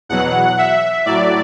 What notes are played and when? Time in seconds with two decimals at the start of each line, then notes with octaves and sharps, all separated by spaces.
0.09 E2 B2 F#3 F#5
0.58 E5
1.06 A2 F#3 D5